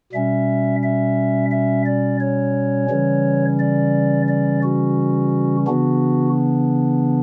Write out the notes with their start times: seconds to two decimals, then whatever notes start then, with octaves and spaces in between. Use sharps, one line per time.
0.13 B2 G3 C#4 E5
0.83 E5
1.51 E5
1.86 D5
2.21 C#5
2.90 C#3 E3 G3 C#4
3.59 D5
4.28 D5
4.63 F#4
5.67 C#3 E3 B3 D4 F#4